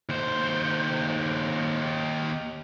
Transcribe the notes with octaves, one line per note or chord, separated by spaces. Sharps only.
D#2 C5